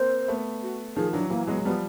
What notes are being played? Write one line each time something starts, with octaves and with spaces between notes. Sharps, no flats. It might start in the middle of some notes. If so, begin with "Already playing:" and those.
Already playing: A#3 C4 C5
A3 B3
F#4
D#3 F3 G#4
E3 F#3 D4
E3 F#3 A#3
F#3 G#3 B3
F#3
F3 G3 B3